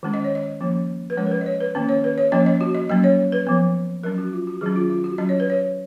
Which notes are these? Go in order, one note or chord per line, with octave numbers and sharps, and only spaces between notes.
D#3 G#3 C#4
D#5
C#5
D#5
F3 A#3 C#4
B4
F3 G#3 C#4 C#5
A#4
B4
D#5
C#5
B4
D#3 A#3 C#4
C#5
B4
C#5
F3 A#3 C#4 D#5
D#5
F#4
D#5
F#3 A#3 C#4 D#5
C#5
B4
F3 B3
F#3 C#4 A#4
F#4
F4
F#4
D#3 F#3 C#4 G#4
F4
F4
F#4
F#3 C#4 D#5
C#5
B4
C#5